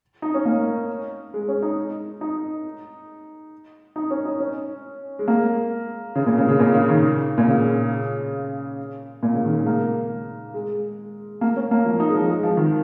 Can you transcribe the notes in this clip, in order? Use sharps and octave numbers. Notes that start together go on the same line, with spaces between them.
D#4
C#4
A#3
G#3
C#4
D#4
D#4
D#4
C#4
D#4
C#4
G#3
A#3
C#3
A#2
C#3
C#3
A#2
C#3
D#3
A#2
C#3
A#2
C#3
D#3
G#3
A#3
G#3
A#3
C#4
A#3
F3
D#4
G#3
F3
G#3
F3
D#3